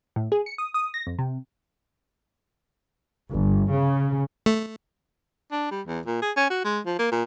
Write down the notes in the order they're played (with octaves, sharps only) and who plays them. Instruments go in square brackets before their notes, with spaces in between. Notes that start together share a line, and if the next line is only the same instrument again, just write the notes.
[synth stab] A2
G#4
C#7
D#6
D#6
A#6
F2
C3
[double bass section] G1
C#3
[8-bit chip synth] A3
[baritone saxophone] D4
G3
E2
A#2
G#4
C#4
F#4
G#3
F3
A#3
A#2